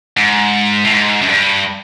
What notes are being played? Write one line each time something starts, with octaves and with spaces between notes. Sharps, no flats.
G#2
A2
G#2
F#2
G2